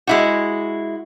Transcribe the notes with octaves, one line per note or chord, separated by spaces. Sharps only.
G#3 E4 F#4